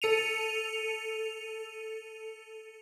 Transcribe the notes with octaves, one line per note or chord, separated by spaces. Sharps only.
A4 C#7 D#7 F7